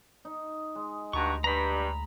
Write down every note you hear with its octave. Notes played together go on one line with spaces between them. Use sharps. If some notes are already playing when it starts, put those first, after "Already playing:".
D#4
G#3
D2 G2 F#4 A#5 C#6
G2 A#5 B5